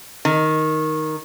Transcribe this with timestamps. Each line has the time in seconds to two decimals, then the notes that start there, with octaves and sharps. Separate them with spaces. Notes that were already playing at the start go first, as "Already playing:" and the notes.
0.25 D#3